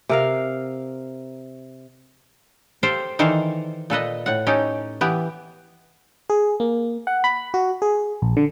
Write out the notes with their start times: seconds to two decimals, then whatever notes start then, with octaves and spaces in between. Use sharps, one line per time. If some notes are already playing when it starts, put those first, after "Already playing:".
0.09 C3 A#4 F5
2.83 G4 A4 C5 F5 G5
3.19 D#3 E3 A4 C5 D5 F5
3.90 A#2 A4 B4 D#5
4.26 A2 F#5
4.47 C#4 D#4 G4 A4
5.01 E3 B3 G4
6.30 G#4
6.60 A#3
7.07 F#5
7.24 B5
7.54 F#4
7.82 G#4
8.22 A#1
8.37 D3